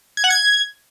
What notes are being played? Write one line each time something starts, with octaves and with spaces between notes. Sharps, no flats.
G#6
F#5
G#6